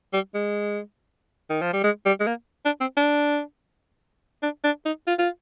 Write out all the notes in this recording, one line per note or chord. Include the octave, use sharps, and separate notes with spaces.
G3
G#3
D#3
F3
G3
G#3
G3
G#3
A#3
D4
C4
D4
D4
D4
D#4
F4
F4